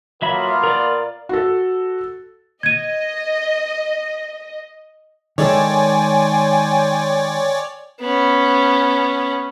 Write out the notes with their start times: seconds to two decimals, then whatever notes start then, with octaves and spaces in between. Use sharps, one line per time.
0.22 F#3 A#3 B3 F4 E5 B5
0.64 A#4 D5
1.29 F#4 A4
2.63 D#5 G#6 D#7
5.38 D#3 G#3 A4 C#5 D5 G5 G#5 C6
8.01 B3 C#4